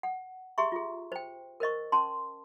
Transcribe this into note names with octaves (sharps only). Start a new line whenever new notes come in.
F#5
G4 G#4 E5 A#5 C6 C#6
F4 G#4
C5 G5
A#4 C5 D#5 C#6
C#4 A5 C6